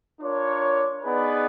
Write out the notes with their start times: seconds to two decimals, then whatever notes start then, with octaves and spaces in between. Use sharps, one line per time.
0.20 D4 F4 A#4 C#5
1.03 B3 D#4 G#4 B4 D5